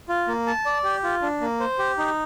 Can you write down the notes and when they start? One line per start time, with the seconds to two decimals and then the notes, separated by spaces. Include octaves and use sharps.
0.09 F4
0.28 A#3
0.47 A5
0.66 D5
0.84 G4
1.03 F4
1.22 D4
1.41 A#3
1.60 C5
1.79 G4
1.98 D#4